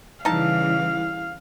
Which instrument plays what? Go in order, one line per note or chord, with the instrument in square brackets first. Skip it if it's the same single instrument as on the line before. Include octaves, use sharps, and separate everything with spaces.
[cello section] C#3 E3 G3 [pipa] D#4 A5 [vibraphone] E4 [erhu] F5